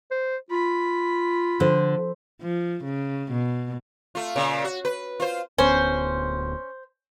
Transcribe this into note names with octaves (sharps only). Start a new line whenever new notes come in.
C5
F4 B5
D3 F3 C5
F3
C#3
B2
A3 F4
A#2 C#3
F#4
B4
F4 C5
D1 D2 B3 C#4 C5